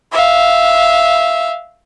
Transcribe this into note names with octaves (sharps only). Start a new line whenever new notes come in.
E5 F5